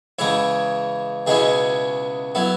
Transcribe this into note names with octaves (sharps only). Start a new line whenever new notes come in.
E2 C#3 G#3 E4 C#5
C#2 B2 G#3 C#4 E4 G#4
F#3 B3 E4